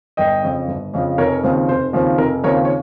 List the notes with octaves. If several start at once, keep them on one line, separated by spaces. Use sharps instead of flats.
G1 D#5 G5
F2 C#3 F3
G1
F2 C#3 F3
F1 A#4 C#5
D#2 C#3 F3 C4
F1 C5
D#2 C#3 F3 C4
F1 A#4
D#2 C#3 F3 C4 A#4 C#5
C#5